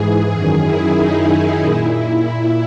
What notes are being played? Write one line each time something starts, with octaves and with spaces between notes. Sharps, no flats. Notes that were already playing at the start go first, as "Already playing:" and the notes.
Already playing: G#2 E3 G#4
F#2 D#3 G#4
E4
D#4
E4
A#2
E4